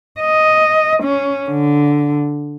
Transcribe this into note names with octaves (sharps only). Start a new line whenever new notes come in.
D#5
C#4
D3